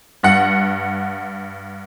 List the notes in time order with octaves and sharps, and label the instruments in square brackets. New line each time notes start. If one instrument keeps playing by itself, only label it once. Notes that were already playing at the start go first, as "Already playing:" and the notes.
[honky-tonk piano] G2 F#5